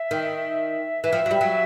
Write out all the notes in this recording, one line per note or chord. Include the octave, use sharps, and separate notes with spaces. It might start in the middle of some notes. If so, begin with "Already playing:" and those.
Already playing: E5
D#3
E3 E5
F3
F#3
G3
F#3